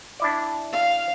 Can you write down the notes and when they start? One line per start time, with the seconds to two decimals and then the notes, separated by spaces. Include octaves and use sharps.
0.20 D4 E4 D5
0.73 F5